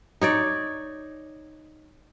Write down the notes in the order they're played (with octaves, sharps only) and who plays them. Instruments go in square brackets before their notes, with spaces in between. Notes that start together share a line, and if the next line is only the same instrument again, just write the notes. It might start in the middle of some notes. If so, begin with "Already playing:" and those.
[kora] D#4 C#5 D5